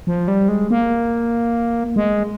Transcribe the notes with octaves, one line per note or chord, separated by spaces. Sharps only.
F3
G3
G#3
A#3
G#3